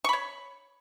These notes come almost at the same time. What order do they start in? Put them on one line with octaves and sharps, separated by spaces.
C#6 B5 C#5